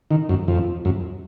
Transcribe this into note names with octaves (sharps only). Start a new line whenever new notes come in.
D#3
F#2
F2
F#2